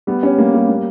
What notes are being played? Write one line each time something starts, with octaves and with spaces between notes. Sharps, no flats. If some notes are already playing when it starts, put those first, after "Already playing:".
G3 B3
C#4 G4
G3 A#3
G3 A#3
A#3